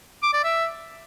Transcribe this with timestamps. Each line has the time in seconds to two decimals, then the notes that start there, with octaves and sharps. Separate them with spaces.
0.23 D6
0.33 D5
0.44 E5